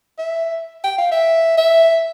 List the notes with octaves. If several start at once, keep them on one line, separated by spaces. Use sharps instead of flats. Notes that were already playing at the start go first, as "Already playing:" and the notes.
E5
G5
F5
E5
E5